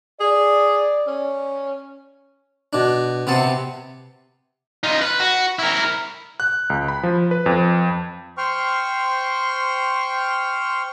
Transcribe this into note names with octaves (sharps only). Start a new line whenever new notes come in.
G#4 D5
C#4
B2 D4
C3 B3 C4 A5
D#4 F4
B4
F#4
E4 A#4
F#6
C#2
B5
F3
B4
F2
C5 G5 C6 C#6 F6